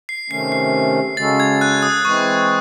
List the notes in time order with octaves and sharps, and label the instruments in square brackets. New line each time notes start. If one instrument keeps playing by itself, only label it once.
[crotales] C7
[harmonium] C3 D#3 A3 C#4 [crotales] C7
[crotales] C7
[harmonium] C#3 G#3 C#4 F#4 A4 [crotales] A6
[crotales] G#6
F#6
D#6
[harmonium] E3 G#3 C4 E4 [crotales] C#6